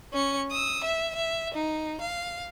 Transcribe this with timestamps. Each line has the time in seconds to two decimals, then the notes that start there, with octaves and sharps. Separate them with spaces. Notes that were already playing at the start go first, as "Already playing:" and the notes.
0.13 C#4 C#7
0.51 D#6 E6
0.84 E5
1.16 E5
1.54 D#4
2.01 F5